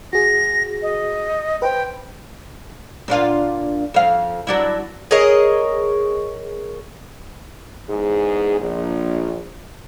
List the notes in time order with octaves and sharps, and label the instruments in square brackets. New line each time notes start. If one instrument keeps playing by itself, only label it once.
[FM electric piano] F#4 G#4 [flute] A#6
[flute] D#5
[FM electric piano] B4 C5 [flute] G5
[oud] A#2 D4 F4
F2 F5
F#3 D4 E4
[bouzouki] G#4 A#4 C#5 D#5
[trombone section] E2 G#2 G#4
A#1